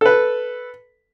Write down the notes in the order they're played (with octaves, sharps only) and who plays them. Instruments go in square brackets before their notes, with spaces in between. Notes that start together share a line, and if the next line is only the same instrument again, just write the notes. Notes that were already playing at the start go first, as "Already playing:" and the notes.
[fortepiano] A4 B4